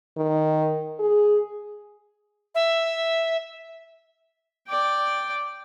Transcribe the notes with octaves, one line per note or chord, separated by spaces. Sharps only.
D#3
G#4
E5
D5 G5